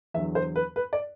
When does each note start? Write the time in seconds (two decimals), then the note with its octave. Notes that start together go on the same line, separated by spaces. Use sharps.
0.14 E2 E5
0.17 D3 F#3
0.35 C5
0.56 B4
0.76 B4
0.93 D5